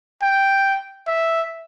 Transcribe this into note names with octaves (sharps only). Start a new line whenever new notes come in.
G5
E5